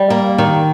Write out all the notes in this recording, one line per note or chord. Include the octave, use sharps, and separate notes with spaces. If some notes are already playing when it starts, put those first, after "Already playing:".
Already playing: G3
A#3
D#3